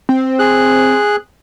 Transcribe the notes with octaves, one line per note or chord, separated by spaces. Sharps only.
C4
G#4 F#6